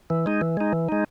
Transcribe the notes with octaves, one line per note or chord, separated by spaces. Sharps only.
E3
G#3 D#4
E3
G#3 D#4
E3
G#3 D#4